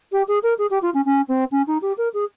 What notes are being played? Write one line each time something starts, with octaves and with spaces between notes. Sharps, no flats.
G4
G#4
A#4
G#4
G4
F4
C#4
C#4
C4
C#4
D#4
G4
A#4
G#4